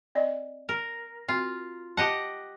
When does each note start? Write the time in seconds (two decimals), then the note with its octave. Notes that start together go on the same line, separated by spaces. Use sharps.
0.15 C4 D5 D#5
0.69 A#4
1.28 C4 F4 F#4
1.97 G4 D#5 F#5 A5